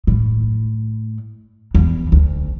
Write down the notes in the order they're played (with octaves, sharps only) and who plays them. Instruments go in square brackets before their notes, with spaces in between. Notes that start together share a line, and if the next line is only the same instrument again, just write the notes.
[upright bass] A2
E2
D2